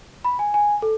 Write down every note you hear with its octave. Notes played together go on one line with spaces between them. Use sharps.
B5
G#5
G#5
A4